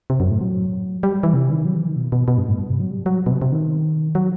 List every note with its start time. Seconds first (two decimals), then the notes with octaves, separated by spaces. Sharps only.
0.10 C3
0.20 F#2
0.31 A2
0.41 F#3
1.03 G3
1.23 E3
1.34 C3
1.50 D#3
1.65 F#3
1.75 E3
1.87 D#3
1.96 B2
2.12 B2
2.28 B2
2.38 G2
2.48 A2
2.59 G2
2.70 C3
2.80 F#3
2.90 G3
3.06 F#3
3.26 B2
3.31 C3
3.42 C3
3.52 D#3
4.15 F#3